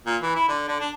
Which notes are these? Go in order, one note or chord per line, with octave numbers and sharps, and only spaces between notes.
A#2
E3
E4
D3
D3
D4